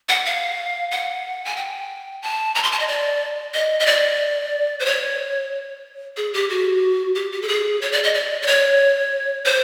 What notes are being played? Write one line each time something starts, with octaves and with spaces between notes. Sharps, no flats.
F#5
F5
F#5
G#5
G5
A5
A#5
C6
A5
D#5
D5
D#5
D#5
D5
C5
C#5
G#4
G4
F#4
G4
G4
A4
G#4
C#5
D5
D#5
D5
D5
C#5
C5